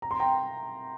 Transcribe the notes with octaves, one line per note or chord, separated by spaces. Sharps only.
A#5
C6
G5 A#5